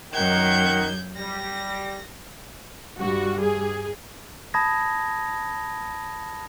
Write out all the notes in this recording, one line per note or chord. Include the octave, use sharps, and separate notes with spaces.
F#2 D#3 F#5 G6 G#6
G3 A#6
G2 G3 F#4
G#4
A5 B5 D#6 G#6 A#6